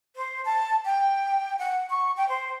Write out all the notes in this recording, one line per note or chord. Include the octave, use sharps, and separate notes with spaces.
C5
A5
G5
F#5
C#6
G5
C5